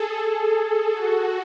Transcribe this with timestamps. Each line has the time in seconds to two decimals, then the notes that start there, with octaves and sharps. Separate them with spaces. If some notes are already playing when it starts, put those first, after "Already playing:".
Already playing: G#4 A4
0.18 G#4
0.92 F#4